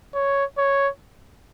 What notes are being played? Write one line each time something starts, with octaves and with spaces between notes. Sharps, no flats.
C#5
C#5